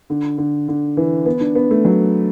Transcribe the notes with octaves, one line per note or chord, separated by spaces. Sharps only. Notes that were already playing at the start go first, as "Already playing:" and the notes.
D3
D3
D3
E3
B3
D4
B3
A3
F#3